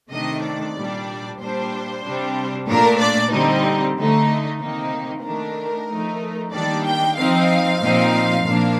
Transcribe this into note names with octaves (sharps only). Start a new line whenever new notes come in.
C3 D#3 A3 D4 D#5
D5
A#2 G3 D4
A#2 G3 D4 C5
C3 G3 D4
A#2 A3 D4 A#4
D5
D3 G3 C4 D#4
D3 A3 D#4
C3 D#3 A#3 D#4
D#3 A3 D4 A#4
F3 A3 D#4
D#3 G3 A#3 D4 D5
G5
F3 C4 D#4 F5
A#2 F3 C4 D#4
A#2 F3 A#3 D4